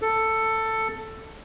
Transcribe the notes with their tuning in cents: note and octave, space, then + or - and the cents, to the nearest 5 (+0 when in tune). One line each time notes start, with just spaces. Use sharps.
A4 +10